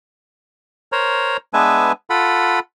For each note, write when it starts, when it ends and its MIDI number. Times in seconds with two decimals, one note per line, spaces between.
0.92 1.37 70
0.92 1.37 72
0.92 1.37 73
0.92 1.37 82
1.54 1.92 56
1.54 1.92 59
1.54 1.92 62
1.54 1.92 71
1.54 1.92 76
1.54 1.92 80
2.10 2.59 65
2.10 2.59 69
2.10 2.59 78
2.10 2.59 83